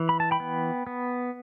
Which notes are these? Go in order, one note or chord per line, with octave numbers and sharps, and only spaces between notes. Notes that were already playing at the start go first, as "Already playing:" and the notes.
Already playing: E3
B5
A5
G5 B5
B3
B3